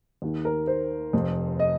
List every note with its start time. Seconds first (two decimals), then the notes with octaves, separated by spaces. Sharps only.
0.22 D#2 D#3
0.45 A#4
0.67 C5
1.13 F1 F2 F3
1.60 D#5